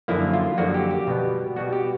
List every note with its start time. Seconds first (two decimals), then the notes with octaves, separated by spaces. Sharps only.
0.08 F#2 D3 F3 A#3 E4
0.33 F4
0.58 F#2 D3 F3 A#3 F#4
0.74 G4
0.91 G4
1.07 B2 G3 B3
1.56 B2 G3 B3 F#4
1.73 G4